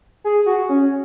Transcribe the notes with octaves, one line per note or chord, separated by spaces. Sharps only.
G#4
F#4
C#4